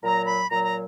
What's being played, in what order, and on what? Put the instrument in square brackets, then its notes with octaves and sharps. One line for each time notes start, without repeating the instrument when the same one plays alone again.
[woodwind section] A#2 F#3 A#5
B5
A#2 F#3 A#5
A#5